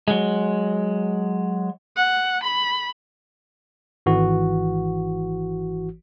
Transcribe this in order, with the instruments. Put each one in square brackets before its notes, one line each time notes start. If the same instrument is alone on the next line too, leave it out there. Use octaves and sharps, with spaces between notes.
[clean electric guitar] F#3 G#3
[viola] F#5
B5
[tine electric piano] G#1 E3 F#4